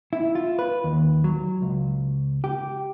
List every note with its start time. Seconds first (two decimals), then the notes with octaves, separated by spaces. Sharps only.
0.13 E4
0.35 F4
0.59 B4
0.84 D#2
1.24 F#3
1.62 C#2
2.44 G4